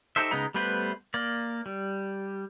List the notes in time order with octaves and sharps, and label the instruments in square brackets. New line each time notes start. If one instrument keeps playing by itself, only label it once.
[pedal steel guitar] D#4 G4 A4 C5 E5
C#3 G#3 B3 D#4 A#5
G3 A3 B3 B4 C5
A#3 D5
G3